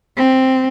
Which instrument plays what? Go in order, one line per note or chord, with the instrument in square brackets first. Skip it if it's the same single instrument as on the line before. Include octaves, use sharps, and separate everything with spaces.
[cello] C4